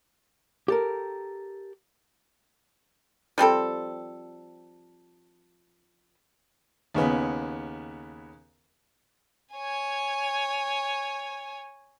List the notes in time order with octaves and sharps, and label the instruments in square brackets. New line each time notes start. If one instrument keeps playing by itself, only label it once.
[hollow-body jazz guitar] G4 A4 A#4
[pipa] F3 G3 C4 A4
[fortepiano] D#2 C#3 B3
[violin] C#5 G#5